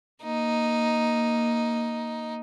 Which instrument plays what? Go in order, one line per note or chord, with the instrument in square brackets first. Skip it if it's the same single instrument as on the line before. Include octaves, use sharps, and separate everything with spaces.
[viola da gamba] A#3 [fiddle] D#4